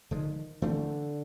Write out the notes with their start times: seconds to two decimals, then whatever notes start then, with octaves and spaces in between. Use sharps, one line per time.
0.11 D3 D#3 F3 G#3
0.62 D3 E3 A3 C4